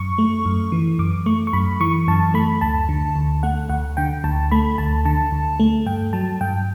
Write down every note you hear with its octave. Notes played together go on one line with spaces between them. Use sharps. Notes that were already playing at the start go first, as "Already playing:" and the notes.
Already playing: F#2 C#6
A3
F#2
E3
F#2 D6
A3 C#6
C#6
F#2 B5
E3 C#6
F#2 A5
A3 B5
D2 A5
D3
D2
A3 F#5
D2 F#5
D3 G5
D2 A5
A3 B5
D2 A5
D3 A5
D2
A3
G2 G5
F#3 A5
G2 G5